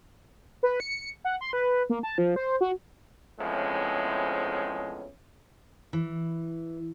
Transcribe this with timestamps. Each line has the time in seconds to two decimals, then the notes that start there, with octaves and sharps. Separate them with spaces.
0.63 B4
0.80 C#7
1.25 F#5
1.41 C6
1.53 B4
1.90 A#3
2.03 A5
2.18 F3
2.36 C5
2.61 F#4
3.39 E2 A2 F3 G#3 C4 C#4
5.93 E3